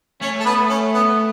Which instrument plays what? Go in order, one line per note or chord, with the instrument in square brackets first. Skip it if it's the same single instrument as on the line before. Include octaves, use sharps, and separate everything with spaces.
[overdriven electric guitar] A3 [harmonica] C#4 C#5
[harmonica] A4
B3 B4
C#4
B3